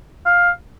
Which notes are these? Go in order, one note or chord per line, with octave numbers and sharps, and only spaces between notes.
F5